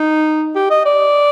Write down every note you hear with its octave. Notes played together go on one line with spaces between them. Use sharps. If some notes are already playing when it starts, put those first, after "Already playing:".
Already playing: D#4
G4
D#5
D5